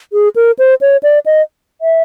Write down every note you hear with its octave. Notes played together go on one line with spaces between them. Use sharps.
G#4
A#4
C5
C#5
D5
D#5
E5